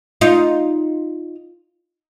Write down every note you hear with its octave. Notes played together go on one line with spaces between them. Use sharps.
D#4 F4